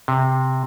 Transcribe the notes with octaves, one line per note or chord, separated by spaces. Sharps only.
C3